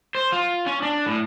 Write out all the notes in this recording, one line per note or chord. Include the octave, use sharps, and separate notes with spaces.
C5
F4
C#4
D4
A2